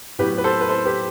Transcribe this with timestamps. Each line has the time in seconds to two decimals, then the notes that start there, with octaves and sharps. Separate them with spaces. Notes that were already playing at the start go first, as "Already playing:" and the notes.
0.19 A2 F#3 B3 G4 B4
0.38 B4
0.44 A4 C5
0.61 B4
0.69 A4 C5
0.85 G4 B4